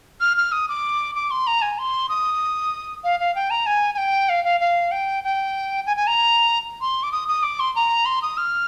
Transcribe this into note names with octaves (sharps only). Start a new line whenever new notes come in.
F6
F6
D#6
D6
D6
C6
A#5
G#5
C6
D#6
F5
F5
G5
A#5
G#5
G#5
G5
F5
F5
F5
G5
G5
G#5
G#5
A#5
C6
D6
D#6
D#6
D6
C6
A#5
C6
D#6
F6